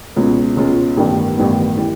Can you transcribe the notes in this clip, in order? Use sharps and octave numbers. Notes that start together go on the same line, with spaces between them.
C#2 B2 G#3 C#4 F4
C#2 B2 G#3 C#4 F4
A1 G2 D#3 G3 B3
A1 G2 D#3 G3 B3
E3 G3